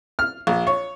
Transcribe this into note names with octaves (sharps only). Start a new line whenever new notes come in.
F6
A#1
C#5